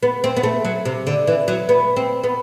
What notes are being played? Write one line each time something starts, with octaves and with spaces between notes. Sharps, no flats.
B3
C4
B3
A3
F#3
C3
D3
E3
F#3
B3
C4
B3